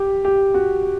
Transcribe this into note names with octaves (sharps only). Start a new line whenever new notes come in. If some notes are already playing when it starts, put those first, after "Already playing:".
Already playing: G4
G4
F#4